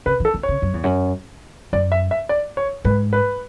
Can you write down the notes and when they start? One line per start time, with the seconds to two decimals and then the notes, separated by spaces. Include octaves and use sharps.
0.06 C#3 B4
0.20 E3
0.25 A4
0.34 E3
0.43 C#3 C#5
0.62 F#2
0.74 E2
0.84 F#2
1.73 F#2 D5
1.92 E5
2.11 E5
2.29 D5
2.57 C#5
2.85 G#2 B4
3.13 B4